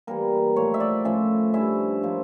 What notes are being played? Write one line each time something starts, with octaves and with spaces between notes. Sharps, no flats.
E3 G3 A#3 A#4
A2 F3 A3 C#5
E5
D5
A2 F3 C#4 F4 E5
G2 F3 C#4 E4 E5
F3 A#3 C#4